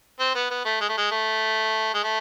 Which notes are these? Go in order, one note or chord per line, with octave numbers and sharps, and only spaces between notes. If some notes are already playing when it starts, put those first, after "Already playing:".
C4
B3
B3
A3
G#3
A3
G#3
A3
G#3
A3